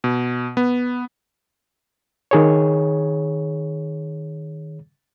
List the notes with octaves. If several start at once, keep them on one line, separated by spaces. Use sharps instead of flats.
B2
B3
D#3 G#4 C#5